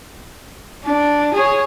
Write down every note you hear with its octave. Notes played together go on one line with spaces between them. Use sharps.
D4
G#4 C#5